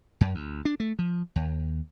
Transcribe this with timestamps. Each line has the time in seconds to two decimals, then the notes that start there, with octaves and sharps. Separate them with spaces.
0.21 F#2
0.35 D2
0.65 D4
0.80 A3
0.99 F3
1.36 D#2